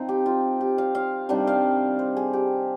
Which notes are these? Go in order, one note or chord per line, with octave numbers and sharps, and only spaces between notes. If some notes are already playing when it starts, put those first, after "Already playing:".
Already playing: F3 C4 D#4
G4
F4
G4
F5
F5
C3 D#3 G3 D4 G5
F5
C5
G#4
G4